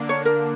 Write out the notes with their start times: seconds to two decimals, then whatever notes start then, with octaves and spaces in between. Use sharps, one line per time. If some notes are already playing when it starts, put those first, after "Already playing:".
Already playing: D3 A#3 D4
0.09 C#5
0.25 A#4